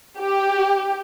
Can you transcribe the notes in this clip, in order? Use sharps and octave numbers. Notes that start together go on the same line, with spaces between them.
G4